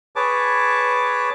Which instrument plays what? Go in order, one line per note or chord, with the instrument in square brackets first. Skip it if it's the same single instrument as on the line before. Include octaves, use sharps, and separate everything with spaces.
[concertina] G#4 B4 C#5 A5 D6